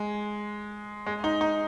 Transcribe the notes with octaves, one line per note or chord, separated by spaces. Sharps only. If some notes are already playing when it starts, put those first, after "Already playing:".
Already playing: G#3
G#3
D#4
D#4